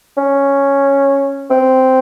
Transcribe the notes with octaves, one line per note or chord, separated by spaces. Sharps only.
C#4
C4